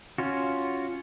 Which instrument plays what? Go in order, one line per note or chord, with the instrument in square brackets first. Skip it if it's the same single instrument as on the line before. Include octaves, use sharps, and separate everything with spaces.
[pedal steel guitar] C#4 F4 F#4